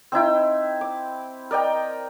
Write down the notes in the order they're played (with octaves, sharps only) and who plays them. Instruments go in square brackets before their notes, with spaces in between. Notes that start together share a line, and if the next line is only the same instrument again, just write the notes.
[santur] C4 D#4 E4 G5
D6
A#4 D5 D#5 G5